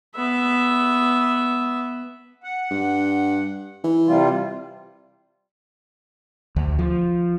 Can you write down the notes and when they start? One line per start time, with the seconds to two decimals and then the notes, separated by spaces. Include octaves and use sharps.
0.16 B3 E5
2.44 F#5
2.71 G2
3.84 E3
4.07 C3 G3 F4
6.56 D2
6.79 F3